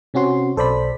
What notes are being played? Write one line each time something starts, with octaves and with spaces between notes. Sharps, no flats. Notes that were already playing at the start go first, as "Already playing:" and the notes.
C3 C4 C#4 F#4 C6
B1 A4 C5 D5 B5 B6